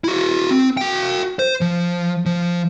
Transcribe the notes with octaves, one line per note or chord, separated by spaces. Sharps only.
E4 F#4
C4
F#4 G5
C5
F3
F3